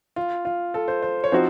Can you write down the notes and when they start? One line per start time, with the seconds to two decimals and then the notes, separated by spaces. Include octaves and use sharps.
0.16 F4
0.45 F4
0.74 A4
0.88 C5
1.02 C5
1.24 C#5
1.32 F3 C4 D#4 F#4 C5